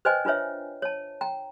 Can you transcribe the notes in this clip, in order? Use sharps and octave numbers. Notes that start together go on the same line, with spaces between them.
B4 C5 D5 D#5 G5 G#5
D4 F4 B4 C#5 E5
C#5 A5
G5 A#5